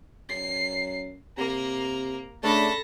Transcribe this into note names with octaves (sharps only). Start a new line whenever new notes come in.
F#2 C7
C3 A#3 A#5
C#3 A3 D4 A4 A5 B5 A#6